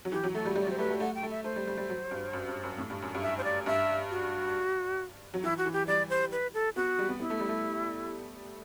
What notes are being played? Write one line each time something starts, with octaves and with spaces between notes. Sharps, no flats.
F#3
E3 G4
F#3
A3 A4
G3
G3
D5
F#3
C5
A3 B4
A3
A3 F#5
G5
A3
E5
A3 C5
G3
G3
G3
F#3
G2
F#2
G2
F#2
A2
G2
F#2
G2
E5
C5
D5
G2 E5
F#4
F#3
E3 E4
F#4
E3
G4
G3 D5
C5
B4
A4
B3 F#4
G3
B3
B3 E4
A3
G3
A3